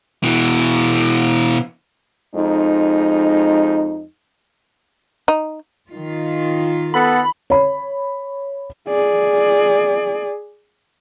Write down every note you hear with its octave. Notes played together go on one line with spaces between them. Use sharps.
B2 E3
F2 G#3 D#4
D#4
D#3 F4
B3 A4 F#5 B5
C#5 B5
G#4 D5